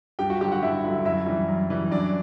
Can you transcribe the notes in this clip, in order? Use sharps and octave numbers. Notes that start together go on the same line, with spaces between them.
G2 G4 G5
F#4 F#5
D3 F#3 G4 G5
F#4 F#5
G2 E4 E5
D3 F#3
F#2 E4 E5
E3 G3
F#2
E3 G3
F#2 D4 D5